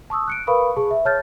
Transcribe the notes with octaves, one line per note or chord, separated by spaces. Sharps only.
A5 C#6 D#6 E6
F#6 C#7 D7
A#4 B4 F5 B5 C#6 D#6
G#4 A5 C#6
E5
C#5 A5 F6 G6 A6